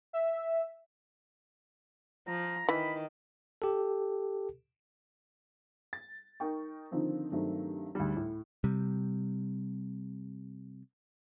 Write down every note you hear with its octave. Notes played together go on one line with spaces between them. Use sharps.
E5
F3 A#5
D#3 E3 B5
G4 A4
A6
D#4 A#4 G5 C#6
D3 D#3 F3 C4 D#4
G2 D#3 F#3 A3 C4 D4
D2 G#2 D3 G3
A2
C3 G3